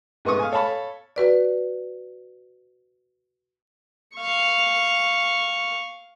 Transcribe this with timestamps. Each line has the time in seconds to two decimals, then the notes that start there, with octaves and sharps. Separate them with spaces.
0.25 G#2 A3 B3 B4 C#6 D#6
0.39 F5 G#5
0.52 A4 C#5 F5 A5 B5
1.16 F#4 B4 D5
4.16 F5 C#6